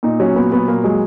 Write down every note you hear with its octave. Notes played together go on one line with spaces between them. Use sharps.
A#2 D#4
F#3 C#4
A#2 B3
F#3 B3
A#2 A#3
F#3 G#3